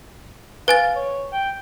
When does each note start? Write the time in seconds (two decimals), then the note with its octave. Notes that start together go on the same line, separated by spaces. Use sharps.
0.68 B4 F5 G#5 A6
0.96 C#5
1.32 G5